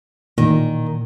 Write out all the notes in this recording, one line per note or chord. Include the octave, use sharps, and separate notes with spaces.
A#2 D#3